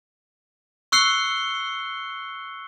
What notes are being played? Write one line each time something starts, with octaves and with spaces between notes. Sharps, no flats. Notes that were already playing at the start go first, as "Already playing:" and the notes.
C#6 E6 F#6 C7 C#7 G7